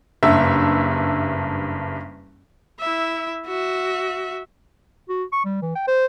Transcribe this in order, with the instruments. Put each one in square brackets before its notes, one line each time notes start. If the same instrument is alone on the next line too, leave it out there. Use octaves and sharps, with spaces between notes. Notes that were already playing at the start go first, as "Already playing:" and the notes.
[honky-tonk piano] F#1 G2 E5
[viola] E4 E5
F#4 E5
[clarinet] F#4
C#6
G3
E3
G5
C5